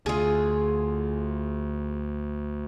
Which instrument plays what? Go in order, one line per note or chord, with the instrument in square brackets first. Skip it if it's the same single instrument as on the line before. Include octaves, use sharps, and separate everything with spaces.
[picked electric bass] D2 [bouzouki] F4 G#4